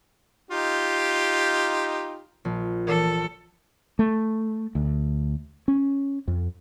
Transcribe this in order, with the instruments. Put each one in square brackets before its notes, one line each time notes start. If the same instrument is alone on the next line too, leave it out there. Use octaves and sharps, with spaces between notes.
[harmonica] D#4 F4 G4
[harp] A#1
[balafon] E3 A#4 [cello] A4
[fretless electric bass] A3
D2
C#4
F2